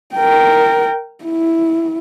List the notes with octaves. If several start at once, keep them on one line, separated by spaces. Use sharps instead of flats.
A#4 G5
E4